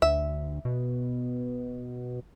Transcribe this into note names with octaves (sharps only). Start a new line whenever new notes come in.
D2 E5
B2